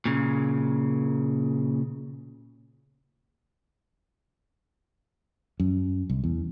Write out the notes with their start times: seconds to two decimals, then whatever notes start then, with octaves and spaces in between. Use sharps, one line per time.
0.05 A#2 C#3
5.60 F#2
6.10 C2
6.24 E2